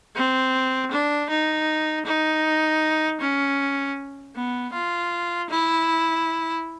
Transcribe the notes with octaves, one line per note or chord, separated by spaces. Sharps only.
C4
D4
D#4
D#4
C#4
B3
F4
E4